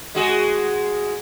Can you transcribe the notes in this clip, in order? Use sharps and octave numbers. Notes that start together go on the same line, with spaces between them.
G#3 F#4 G#4